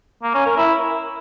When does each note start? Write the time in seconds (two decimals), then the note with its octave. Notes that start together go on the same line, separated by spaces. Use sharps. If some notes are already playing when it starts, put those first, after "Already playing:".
0.23 A#3
0.34 C#4
0.46 A#4
0.57 E4